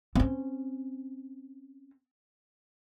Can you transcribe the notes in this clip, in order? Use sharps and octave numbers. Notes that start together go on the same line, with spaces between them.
C4 C#4